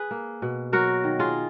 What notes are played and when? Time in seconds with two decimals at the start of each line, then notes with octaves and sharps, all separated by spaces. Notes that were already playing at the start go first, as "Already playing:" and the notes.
Already playing: G#4 B4
0.11 A#3
0.42 B2
0.72 F#3 F#4 A#4
1.04 D#3
1.19 F4 G#4